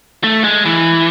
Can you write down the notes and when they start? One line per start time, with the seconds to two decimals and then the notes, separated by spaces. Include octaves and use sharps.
0.24 A3
0.44 G#3
0.66 E3